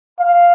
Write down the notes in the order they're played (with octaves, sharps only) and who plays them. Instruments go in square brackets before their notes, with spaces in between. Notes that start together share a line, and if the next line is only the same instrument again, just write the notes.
[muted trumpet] F5